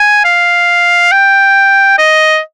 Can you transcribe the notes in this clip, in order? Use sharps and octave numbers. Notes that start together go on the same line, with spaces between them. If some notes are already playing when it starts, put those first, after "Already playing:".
Already playing: G#5
F5
G5
D#5